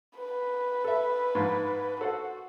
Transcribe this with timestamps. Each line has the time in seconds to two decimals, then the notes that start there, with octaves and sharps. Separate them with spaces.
0.17 B4
0.84 A4 E5
1.35 G#2 F3
2.01 F#4 A4 C5 F#5